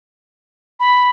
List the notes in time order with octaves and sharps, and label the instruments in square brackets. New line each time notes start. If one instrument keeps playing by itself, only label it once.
[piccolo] B5